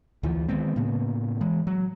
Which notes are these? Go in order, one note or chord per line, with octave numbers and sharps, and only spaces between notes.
D2 E3 F3
D#3 G#3 B3 C4
A2 C#3 A#3 B3
E3 G#3
F#3